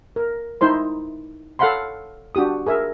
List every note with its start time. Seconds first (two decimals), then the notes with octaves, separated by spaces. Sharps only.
0.16 A#4
0.61 D#4 E4 C5 C6
1.59 A4 C#5 F5 F#5 B5 C6
2.35 D4 F#4 G4 D#6
2.66 G#4 A#4 E5